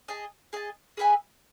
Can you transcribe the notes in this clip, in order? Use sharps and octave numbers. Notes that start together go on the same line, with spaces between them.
G#4 D#5 A5
G#4 D#5 A5
G#4 B4 E5 G#5